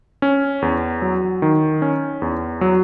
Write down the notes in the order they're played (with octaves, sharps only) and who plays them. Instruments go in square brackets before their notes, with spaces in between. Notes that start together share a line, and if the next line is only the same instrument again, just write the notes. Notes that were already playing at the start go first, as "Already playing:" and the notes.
[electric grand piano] C#4
E2
F#3
D#3
C#4
E2
F#3